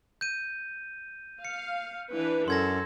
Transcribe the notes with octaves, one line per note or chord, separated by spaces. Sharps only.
G6 D#7
F5 C#7
E3 D4 B4
F#2 A4 C6 G#6 A#6